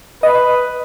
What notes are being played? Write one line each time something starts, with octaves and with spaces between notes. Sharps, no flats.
B4 D#5